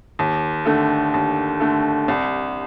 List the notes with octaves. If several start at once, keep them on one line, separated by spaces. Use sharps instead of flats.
D#2
D3 A3
D#2
D3 A3
C2